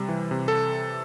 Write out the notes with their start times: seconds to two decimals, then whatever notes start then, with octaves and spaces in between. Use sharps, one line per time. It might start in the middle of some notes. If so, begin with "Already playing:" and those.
Already playing: C3 G3
0.09 E3
0.31 C3
0.48 A4